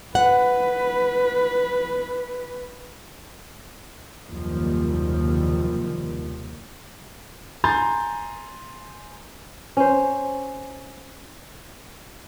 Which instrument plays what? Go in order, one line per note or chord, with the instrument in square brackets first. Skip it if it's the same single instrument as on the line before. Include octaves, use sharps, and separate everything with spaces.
[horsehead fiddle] B4 [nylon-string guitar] F#5
[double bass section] F#1 D#2 C3 F3 G3
[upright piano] G#5 A#5 C6 G6 A6
[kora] C#4 C5